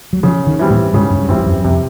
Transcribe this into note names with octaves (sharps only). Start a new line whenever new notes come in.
F#3
C#3 F3
D#3
E3 G3 C4
A2
G#2 C#3
G2
G2 E3 G3 C4
F2
F#2
F2 C3